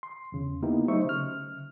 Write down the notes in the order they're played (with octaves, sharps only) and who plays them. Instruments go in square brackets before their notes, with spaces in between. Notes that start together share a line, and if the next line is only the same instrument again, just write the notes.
[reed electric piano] C6
E2 C#3
A#3 B3 D#4 E4 G4 A#4
F#3 A3 D#4 C5 E5 C#6
C#3 F6